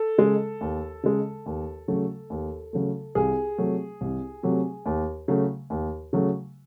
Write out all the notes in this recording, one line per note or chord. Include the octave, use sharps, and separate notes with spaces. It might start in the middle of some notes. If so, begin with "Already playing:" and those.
Already playing: A4
C#3 G#3
D#2
C#3 G#3
D#2
C#3 F#3 A3
D#2
C#3 F#3 A3
C2 G#4
C3 F#3 A3
C2
C3 F#3 A3
D#2
C#3 F#3 A3
D#2
C#3 F#3 A3